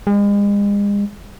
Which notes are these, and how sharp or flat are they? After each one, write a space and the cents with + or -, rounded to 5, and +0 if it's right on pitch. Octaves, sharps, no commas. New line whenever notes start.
G#3 -40